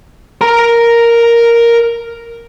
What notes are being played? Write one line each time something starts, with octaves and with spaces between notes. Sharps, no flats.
A#4 A#5